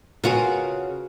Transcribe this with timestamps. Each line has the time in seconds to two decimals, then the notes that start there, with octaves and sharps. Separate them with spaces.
0.24 C#3 F4 F#4 A#4 B4 F#5 G#5